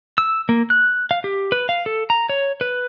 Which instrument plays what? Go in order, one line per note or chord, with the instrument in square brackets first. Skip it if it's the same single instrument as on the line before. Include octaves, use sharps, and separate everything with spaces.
[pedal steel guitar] E6
A#3
F#6
F5
G4
B4
F5
A4
A#5
C#5
B4